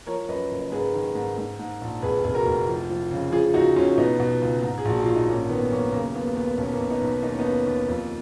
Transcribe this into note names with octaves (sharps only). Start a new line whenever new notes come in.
F3 A#4 C#5
F#2 B4 D#5
F#1
G#2 G#4 B4
D#3
G#2
G#2
G#2
A#1
F1 G#4 B4
F1 G#4
F#4 A#4
F1
F3
F3
C#3
F3 F4 G#4
C#2 D#4 F#4
C#2 C#4 F4
B2 B3 D#4
B2
C#2
G#2
G#4
A#1 F#4
A#1 F4
D#4
G#1 A#3 C#4
D#3 B3
F#2 A#3 C#4
C#3 A#3
D#2 B3
D#2 B3
B1 C#4
B3
A#3 C#4
B1
B3 D#4
B1
D#2 D#4
C#4
B3 D#4
D#2
D#2
F2